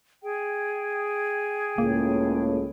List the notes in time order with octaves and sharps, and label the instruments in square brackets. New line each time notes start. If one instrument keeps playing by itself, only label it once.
[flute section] G#4 G5
[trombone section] C#2 A2 C#3 [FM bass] A#3